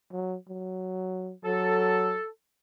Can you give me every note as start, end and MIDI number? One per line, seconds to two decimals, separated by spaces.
0.13 0.36 54
0.49 1.33 54
1.45 2.17 54
1.45 2.26 69